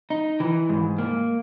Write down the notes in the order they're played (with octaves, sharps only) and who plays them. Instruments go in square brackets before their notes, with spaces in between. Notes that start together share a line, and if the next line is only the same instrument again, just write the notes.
[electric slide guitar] D#4
E3
G#2
A#3